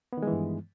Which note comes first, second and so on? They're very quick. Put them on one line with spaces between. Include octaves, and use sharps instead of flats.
B3 D#3 G#3 E3 G2